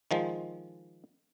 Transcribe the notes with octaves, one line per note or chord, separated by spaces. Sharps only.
D#3 F3 G#3